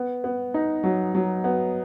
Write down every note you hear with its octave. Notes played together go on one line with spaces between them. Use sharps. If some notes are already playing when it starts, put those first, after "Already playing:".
Already playing: B3
B3
D#4
F#3
F#3
B3